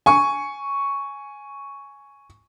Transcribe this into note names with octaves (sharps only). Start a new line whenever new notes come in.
G#5 C#6